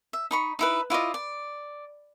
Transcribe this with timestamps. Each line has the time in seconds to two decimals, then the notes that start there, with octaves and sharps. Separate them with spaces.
0.13 E5
0.31 D#4 B5 C#6
0.59 D#4 E4 B4
0.90 E4 F4 D5 D#5
1.14 D5